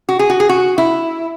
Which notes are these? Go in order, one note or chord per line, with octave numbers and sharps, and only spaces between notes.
F#4
G#4
F#4
G#4
F#4
E4